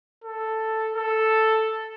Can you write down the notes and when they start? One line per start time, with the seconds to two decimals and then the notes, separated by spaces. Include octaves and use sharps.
0.24 A4
0.96 A4